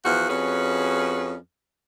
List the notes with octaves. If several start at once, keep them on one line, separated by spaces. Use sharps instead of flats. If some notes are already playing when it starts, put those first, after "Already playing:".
E2 F3 F#4 F#5
F2 C#4 F#4 G#4 B4